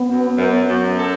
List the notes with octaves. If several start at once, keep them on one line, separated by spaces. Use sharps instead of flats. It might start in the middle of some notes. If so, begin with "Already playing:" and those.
Already playing: B3
F#2
F#2
F#2
A4